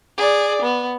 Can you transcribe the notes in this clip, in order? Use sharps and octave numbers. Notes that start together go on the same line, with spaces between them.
G#4 D5
B3